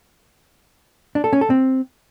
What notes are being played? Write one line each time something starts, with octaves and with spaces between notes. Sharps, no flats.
D4
A4
C#4
A4
C4